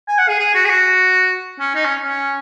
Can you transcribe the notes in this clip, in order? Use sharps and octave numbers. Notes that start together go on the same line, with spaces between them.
G#5
F#5
G#4
G#4
F#4
G#4
F#4
C#4
D#4
C#4
C#4